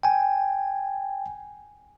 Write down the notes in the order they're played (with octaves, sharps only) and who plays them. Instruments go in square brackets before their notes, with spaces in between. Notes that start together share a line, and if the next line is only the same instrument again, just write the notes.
[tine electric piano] G5 G#5